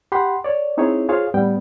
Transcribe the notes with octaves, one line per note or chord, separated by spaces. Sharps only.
G4 F#5 B5 C6
C#5 D5
C4 D#4 E4 G#4 C#5
F4 G#4 C5 C#5 F5
A2 G3 B3 G5